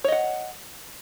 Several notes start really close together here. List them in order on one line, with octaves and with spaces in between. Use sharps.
C#5 D#5 F#5